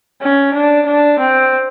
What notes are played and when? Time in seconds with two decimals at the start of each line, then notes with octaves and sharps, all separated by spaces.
0.22 C#4
0.54 D4
0.86 D4
1.19 C4